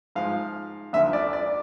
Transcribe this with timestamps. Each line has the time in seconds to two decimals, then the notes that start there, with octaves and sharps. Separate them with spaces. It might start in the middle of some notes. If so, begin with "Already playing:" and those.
0.16 G#2 F3 F5
0.93 D2 D3 F3 E5
1.13 D5
1.33 D5